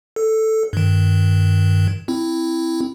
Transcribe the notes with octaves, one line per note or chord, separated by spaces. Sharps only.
A4
G2 D#3
C4 E4